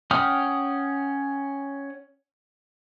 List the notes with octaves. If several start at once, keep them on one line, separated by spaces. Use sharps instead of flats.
C#4 F#5 G5 D#6 F6